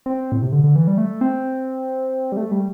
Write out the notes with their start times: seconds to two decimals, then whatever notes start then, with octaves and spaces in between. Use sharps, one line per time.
0.06 C4
0.32 A2
0.42 C3
0.52 D3
0.64 D3
0.76 E3
0.87 G3
0.98 A3
1.21 C4
2.32 G3
2.37 A3
2.52 G3